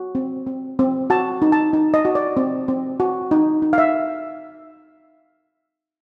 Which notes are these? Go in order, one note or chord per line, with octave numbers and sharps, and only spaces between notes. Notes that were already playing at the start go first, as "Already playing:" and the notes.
Already playing: F#4
C4
C4
C4
F#4 A5
D#4
A5
D#4
D#5
F#4
D5
C4
C4
F#4
D#4
D#4
F5
E5